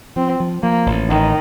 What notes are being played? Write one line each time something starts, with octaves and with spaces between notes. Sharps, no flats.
F3 C4
F3
F3 A#3
A1
A1 D#3